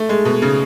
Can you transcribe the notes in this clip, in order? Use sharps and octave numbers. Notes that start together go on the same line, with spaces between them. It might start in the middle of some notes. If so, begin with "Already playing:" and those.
Already playing: A3
G#3
B2
C#3